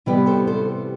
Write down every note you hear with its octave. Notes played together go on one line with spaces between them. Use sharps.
C3 E3 G3 B3 G4 B4
A4 C5
A4 C5